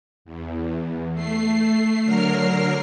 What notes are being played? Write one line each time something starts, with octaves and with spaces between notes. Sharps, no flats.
E2
A3 C7
D3 F#3 A#4 F6 C7